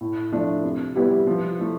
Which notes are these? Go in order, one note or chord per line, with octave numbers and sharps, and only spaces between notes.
A2
F3 A3 D4
C3
G3 B3 E4 G4
F3
A3 E4